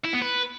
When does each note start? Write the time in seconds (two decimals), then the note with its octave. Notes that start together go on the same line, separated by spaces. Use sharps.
0.05 E4
0.13 B3
0.22 B4